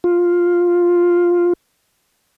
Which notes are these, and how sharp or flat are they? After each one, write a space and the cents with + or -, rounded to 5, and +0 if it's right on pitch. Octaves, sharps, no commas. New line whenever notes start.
F4 +5